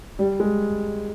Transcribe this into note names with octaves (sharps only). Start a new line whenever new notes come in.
G3
G#3